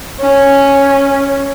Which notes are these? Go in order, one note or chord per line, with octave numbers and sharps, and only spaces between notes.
C#4